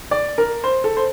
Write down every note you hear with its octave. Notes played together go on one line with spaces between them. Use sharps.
D5
A#4
C5
A4
C5